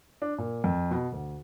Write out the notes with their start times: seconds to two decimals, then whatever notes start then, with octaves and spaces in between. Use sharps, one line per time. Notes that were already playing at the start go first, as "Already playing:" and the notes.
0.22 D4
0.38 A#2
0.64 F2
0.91 B2
1.12 D2